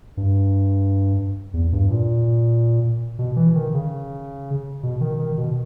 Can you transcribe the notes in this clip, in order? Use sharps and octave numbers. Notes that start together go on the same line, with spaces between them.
G2
E2
G2
A#2
B2
E3
D#3
C#3
B2
D#3
D#3
B2